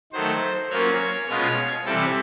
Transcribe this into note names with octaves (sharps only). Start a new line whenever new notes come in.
D#3 F#3 A3 C5
F#3 A#3 C#4 F4 C#5
B2 G#3 C#4 F4 C#5
C3 E3 G3 C4 A4